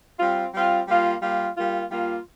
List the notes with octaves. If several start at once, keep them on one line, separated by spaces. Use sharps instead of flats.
G3 C4 F4
G3 C4 F4
G3 A#3 F4
G3 A#3 F4
G3 A#3 F4
G3 A#3 F4